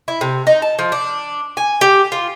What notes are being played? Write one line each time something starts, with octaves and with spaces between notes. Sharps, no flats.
E4
C3
D#4
A5
F3
D4
G#5
G4
F4